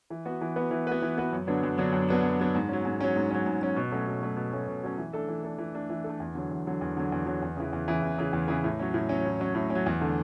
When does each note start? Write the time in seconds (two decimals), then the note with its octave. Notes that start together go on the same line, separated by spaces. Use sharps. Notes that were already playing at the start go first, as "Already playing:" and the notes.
0.10 E3
0.25 B3 F#4 B4
0.41 E3
0.56 B3 F#4 B4
0.71 E3
0.87 B3 F#4 B4
1.02 E3
1.18 B3 F#4 B4
1.32 F#2
1.47 D3 F#3 B3 D4
1.63 F#2
1.78 D3 F#3 B3 D4
1.93 F#2
2.09 D3 F#3 B3 D4
2.23 F#2
2.39 D3 F#3 B3 D4
2.55 G#2
2.69 F#3 C#4
2.85 G#2
3.00 F#3 C#4
3.16 G#2
3.31 F#3 C#4
3.46 G#2
3.61 F#3 C#4
3.76 B2
3.91 F#3 A3 C#4
4.06 B2
4.22 F#3 A3 C#4
4.36 B2
4.53 F#3 A3 C#4
4.68 B2
4.83 F#3 A3 C#4
4.98 E3
5.13 A3 D4 A4
5.28 E3
5.43 A3 D4 A4
5.58 E3
5.75 A3 D4 A4
5.90 E3
6.04 A3 D4 A4
6.20 E2
6.35 D3 F#3
6.51 E2
6.66 D3 F#3
6.81 E2
6.97 D3 F#3
7.12 E2
7.26 D3 F#3
7.42 E2
7.57 C#3 E3
7.73 E2
7.88 C#3 E3
8.02 E2
8.18 C#3 E3
8.33 E2
8.48 C#3 E3
8.64 A2
8.79 F#3 C#4
8.94 A2
9.09 F#3 C#4
9.25 A2
9.40 F#3 C#4
9.55 A2
9.70 C#4
9.75 F#3
9.86 E2
10.01 D3 A3